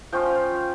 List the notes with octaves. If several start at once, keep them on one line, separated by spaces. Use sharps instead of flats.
F3 C#4 F4 G5